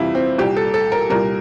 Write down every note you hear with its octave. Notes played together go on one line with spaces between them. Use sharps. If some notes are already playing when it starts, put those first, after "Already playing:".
Already playing: F2 C3 E3 G3 E4 F4
C4
C2 A#2 G3 G4
A4
A4
A#4
C2 A#2 G3 A#4